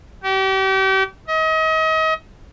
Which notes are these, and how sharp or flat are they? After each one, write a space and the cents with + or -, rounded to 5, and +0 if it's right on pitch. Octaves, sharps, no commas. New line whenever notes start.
G4 -35
D#5 +35